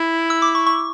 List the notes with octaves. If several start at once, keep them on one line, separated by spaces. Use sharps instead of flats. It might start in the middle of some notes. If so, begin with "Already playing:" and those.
Already playing: E4
E6
D6
C#6
C#6